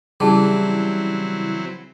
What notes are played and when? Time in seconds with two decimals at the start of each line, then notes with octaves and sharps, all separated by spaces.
0.20 C#3 E3 F#3 G3 C4 E4 G#4 A5